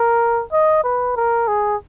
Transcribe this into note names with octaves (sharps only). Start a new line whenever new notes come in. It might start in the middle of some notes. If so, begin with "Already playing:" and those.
Already playing: A#4
D#5
B4
A#4
G#4